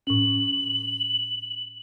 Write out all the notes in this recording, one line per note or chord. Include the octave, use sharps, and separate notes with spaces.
A2 C#4 F#7